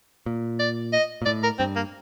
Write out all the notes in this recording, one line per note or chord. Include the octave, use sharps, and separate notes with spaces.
A#2
D5
D#5
A#2
A2 D5
A#4
G2 C4
A#3